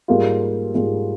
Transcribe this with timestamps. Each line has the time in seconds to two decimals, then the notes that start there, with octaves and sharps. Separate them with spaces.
0.08 G#2 G3 A#3 F4
0.75 G#2 G3 A#3 F4